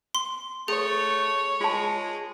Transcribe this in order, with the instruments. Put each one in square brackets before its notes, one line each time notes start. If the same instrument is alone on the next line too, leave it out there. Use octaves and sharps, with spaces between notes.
[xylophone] C6
[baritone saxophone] A3 [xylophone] G#4 [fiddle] C#5
[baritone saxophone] G#3 [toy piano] F4 A5